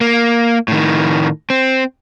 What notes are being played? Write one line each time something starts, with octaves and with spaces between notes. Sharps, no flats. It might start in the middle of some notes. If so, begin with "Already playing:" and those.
A#3
A2 D#3
C4